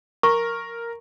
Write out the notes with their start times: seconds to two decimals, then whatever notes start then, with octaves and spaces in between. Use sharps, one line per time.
0.23 A#4 A#5 C#6